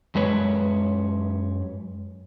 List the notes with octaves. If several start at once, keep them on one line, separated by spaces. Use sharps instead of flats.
F#2 G#3 B4 C#5